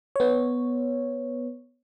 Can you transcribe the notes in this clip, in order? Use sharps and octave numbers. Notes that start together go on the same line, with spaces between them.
B3 C#5